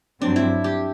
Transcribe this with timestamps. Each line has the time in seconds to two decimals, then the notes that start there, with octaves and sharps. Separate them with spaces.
0.22 G2 F#3 C4 D4
0.36 E4
0.64 G4